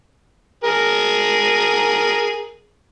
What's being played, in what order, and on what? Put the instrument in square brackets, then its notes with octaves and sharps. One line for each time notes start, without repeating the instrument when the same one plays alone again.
[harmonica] G#4 A#4